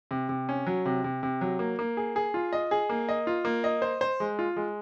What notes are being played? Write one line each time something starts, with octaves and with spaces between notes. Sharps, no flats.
C3
C3
C#4
F#3
C3
C3
C3
F#3
A#3
A#3
G#4
G#4
F4
D#5
G#4
A#3
D#5
F4
A#3
D#5
C5
C5
G#3
F4
G#3